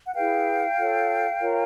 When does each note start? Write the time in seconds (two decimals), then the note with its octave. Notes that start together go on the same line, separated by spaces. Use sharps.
0.06 F#5
0.14 E4 G#4 B4 F5 G5
0.77 F4 A4 C#5
1.40 F4 A#4 C#5